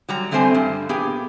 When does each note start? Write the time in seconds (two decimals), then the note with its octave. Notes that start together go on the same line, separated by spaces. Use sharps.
0.09 F#3 G3 A#5
0.31 D3 G3 A3 C4 C5 G#5
0.54 G2
0.89 A#2 B3 G4 G#4